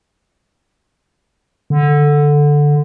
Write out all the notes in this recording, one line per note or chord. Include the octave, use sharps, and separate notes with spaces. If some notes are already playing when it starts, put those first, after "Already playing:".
D3